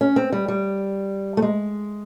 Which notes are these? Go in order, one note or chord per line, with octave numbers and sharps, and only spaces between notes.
C#4
C4
G3
G3
A3
G#3